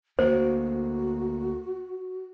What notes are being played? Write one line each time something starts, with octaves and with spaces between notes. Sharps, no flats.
D2 A#3 F#4 C5